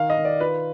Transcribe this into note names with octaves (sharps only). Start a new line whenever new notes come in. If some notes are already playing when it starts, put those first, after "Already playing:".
Already playing: D#3 F5
D#5
D#3
D5
F4 B4